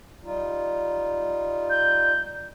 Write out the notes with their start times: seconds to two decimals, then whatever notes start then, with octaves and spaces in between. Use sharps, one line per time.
0.24 G3 D#4 F4
1.70 G6